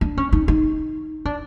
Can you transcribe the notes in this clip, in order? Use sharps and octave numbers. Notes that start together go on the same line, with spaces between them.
D4
C#4
D#4
D#4
D4